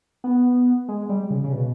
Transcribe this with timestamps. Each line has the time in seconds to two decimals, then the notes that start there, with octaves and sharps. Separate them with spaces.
0.24 B3
0.89 G#3
1.09 G3
1.30 C#3
1.44 C#3
1.53 B2